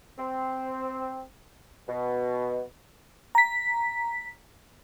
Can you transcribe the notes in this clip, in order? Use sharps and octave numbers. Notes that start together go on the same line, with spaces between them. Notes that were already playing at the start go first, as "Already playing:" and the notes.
C4
B2
A#5 B6